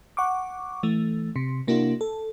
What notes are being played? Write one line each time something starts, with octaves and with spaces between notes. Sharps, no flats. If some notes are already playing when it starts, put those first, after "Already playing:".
F#5 C#6 D6
E3 A3
C3
C3 A#3 D4 E4 F#4
A4